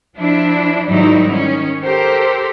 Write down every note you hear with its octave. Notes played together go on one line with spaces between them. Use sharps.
F3 D4 E4
G#2 D#3 F#3 G3 D#4 E4
D#3 C#4
G4 A4 A#4 C5